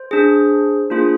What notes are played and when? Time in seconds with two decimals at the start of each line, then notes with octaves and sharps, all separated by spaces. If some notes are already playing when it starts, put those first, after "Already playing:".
Already playing: C5
0.11 D4 G#4
0.90 A#3 D4 F4 G#4